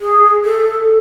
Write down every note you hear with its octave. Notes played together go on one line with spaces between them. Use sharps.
G#4
A4